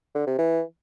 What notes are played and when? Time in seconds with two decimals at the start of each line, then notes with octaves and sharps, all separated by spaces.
0.15 D3
0.27 C3
0.38 E3